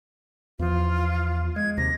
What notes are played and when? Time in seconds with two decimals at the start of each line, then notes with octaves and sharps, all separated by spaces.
0.59 E2 F3 F4
1.56 G#3 G#6
1.78 D#2 C3 A#6